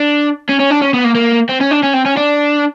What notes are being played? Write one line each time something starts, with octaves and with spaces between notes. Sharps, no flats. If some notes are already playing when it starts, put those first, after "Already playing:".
Already playing: D4
C#4
C#4
D4
C#4
B3
A#3
A#3
C4
C#4
D4
C#4
C4
C#4
D4